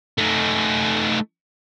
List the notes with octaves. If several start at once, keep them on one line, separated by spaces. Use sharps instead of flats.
A3 D#4